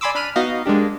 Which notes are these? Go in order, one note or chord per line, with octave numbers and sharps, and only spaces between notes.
D5 G#5 B5 C6 D6 E6
D4 B5 F6 D#7
B3 D#4 F#4 D#5 F5
G#3 A#3 D4 G4